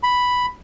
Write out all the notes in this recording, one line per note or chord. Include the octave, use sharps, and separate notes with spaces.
B5